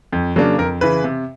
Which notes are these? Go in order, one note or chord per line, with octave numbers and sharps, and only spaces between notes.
F2
C#3 F#3 A#3 D4
F2 A#4
C#3 E3 B4
C3